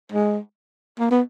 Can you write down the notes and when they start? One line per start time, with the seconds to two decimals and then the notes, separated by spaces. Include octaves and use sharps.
0.12 G#3
0.99 A#3
1.11 B3